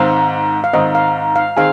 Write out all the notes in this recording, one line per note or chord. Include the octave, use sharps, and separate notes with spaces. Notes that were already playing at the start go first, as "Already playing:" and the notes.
Already playing: G#2 D#3 C4 F5
F5
G#2 D#3 C4 D#5
F5
F5
D#3 C4 G#4 F5